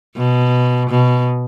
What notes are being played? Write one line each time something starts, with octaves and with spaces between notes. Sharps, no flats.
B2
B2